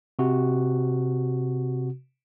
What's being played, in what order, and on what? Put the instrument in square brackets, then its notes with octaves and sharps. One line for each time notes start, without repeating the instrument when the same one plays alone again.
[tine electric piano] C3 F#4